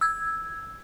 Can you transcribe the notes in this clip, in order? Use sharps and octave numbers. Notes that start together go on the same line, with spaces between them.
E6 G#6